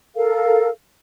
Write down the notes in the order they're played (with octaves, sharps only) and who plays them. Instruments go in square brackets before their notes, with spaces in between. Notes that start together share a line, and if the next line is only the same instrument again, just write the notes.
[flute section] A4 A#4 F5